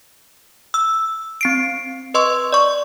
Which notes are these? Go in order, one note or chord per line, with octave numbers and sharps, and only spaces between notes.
E6
C4 C7 D7
B4 D#5 C6 C#6 E6
D5 C#6